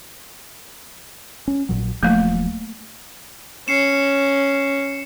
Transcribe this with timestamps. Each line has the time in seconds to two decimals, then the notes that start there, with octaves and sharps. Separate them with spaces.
1.48 C#4
1.69 A#1 A#2 F#3
2.03 D#1 F3 F#3 A3 A#3
3.68 C#4 C7 C#7 E7